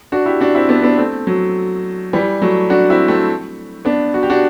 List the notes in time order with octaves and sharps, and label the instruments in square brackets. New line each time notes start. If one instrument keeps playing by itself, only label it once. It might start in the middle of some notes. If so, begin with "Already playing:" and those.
[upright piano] D4 F#4
E4 G4
D4 F#4
C4 E4
B3 D4
B3 D4
A3 C4
F#3
E3 G3
F#3 A3
D4 F#4
C4 E4
A3 C4
B3 D4
F#4
G4
D4 F#4